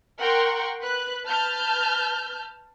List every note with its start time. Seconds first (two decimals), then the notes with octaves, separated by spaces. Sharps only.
0.19 A#4 F#5 G5 C6 C#6
0.83 B4 F#6
1.25 B4 A5 F6 G6